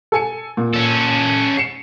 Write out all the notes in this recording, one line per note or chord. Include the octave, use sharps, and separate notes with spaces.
A4 G#5 C#7
A#2
C#4 A4
C7 C#7 E7